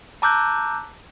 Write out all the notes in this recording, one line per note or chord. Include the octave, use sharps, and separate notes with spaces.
A5 A#5 D6 E6 F#6 G6